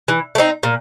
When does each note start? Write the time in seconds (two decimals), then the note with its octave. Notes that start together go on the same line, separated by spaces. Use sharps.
0.08 E3
0.35 A3
0.38 C4 D#4
0.63 A#2